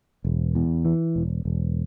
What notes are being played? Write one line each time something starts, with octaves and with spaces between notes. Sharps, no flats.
E1
E2
E3
E1
E1